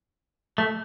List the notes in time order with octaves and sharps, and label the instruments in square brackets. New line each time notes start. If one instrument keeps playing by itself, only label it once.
[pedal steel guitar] A3